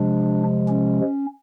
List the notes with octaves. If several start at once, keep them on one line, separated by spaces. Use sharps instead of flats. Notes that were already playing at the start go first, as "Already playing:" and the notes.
Already playing: C3 F3 G#3 D4
C#4